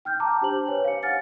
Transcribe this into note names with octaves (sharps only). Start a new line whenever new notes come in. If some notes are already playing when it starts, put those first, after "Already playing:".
G5 F6 G6
G5 A5 A#5 D6
D4 G4 C5 F#7
B4 C#5 G#5
F5 C#7
F#5 G#5 F6 A6 C#7